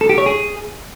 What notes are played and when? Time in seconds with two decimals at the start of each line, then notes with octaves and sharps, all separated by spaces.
0.01 A4
0.09 G4
0.18 C#5
0.26 G#4